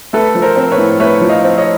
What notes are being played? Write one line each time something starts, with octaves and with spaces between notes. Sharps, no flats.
A3 A4 B4
F3
A#4 C5
C4
B4 C#5
A2
A3 B4 C#5
F3
D#5 F5
C4
C#5 D#5